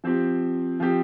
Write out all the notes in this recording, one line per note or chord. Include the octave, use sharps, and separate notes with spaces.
F3 C4 G4
F3 C4 G4